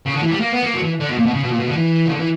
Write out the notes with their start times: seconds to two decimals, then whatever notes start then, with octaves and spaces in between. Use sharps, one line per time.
0.06 C#3
0.14 D3
0.23 E3
0.31 G3
0.40 A#3
0.52 B3
0.63 A#3
0.74 F#3
0.82 E3
1.00 D3
1.09 B2
1.18 A#2
1.26 B2
1.34 C#3
1.43 B2
1.51 A#2
1.59 B2
1.68 D3
1.76 E3
2.06 C#3
2.11 D3
2.19 E3